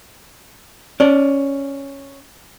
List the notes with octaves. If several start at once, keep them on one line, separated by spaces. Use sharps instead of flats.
C#4 D5